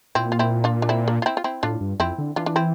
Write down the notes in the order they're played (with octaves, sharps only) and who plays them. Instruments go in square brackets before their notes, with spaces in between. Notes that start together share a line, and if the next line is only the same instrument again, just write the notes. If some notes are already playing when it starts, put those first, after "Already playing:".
[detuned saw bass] A#2 [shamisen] C4 E4
[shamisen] F4
C4 E4
D4 F4
D4
C4 E4
A#3 D4
F4
C4 E4
F4
C4 E4
[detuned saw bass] A2 [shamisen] D4 F4
[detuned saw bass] G2
[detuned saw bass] F2 [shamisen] C4 E4
[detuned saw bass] D3
[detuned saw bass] E3 [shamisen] D4 F4
[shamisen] D4
C4 E4